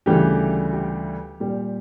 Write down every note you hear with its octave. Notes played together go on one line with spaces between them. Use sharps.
D2 C#3 E3 G3 G4
G4
A#2 G3